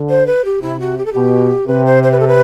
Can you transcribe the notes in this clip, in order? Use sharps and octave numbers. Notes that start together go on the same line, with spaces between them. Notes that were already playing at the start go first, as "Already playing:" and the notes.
Already playing: D3
C5
B4
G4
C3 E4
F#4
G4
A4
B2 G4
C3 B4
C5
C5
B4
A4
B4